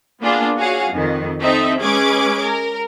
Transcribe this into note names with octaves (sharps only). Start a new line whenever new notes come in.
A#3 B3 D4 F4 G#4
F#4 G#4 C#5 F5 F#5
F2 D#3
C4 D#4 A4 E5
G#3 C#4 G#4 B4 D6 G#6
A#4